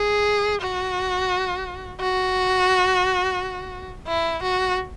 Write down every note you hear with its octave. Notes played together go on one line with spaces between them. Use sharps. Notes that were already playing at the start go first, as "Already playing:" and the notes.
Already playing: G#4
F#4
F#4
E4
F#4